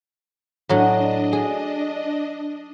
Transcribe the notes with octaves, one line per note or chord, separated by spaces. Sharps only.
A2 F#3 D4 D#5
G#4